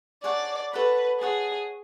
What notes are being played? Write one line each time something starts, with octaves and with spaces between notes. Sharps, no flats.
G#4 C#5 D5 F#5 A5
A4 B4 C#5 F#5 B5
G#4 C#5 F#5 A5